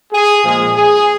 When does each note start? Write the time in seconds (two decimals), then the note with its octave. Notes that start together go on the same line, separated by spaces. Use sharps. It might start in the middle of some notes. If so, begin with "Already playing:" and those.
0.13 G#4
0.45 A#2 F3 G#3 G#4
0.76 G#4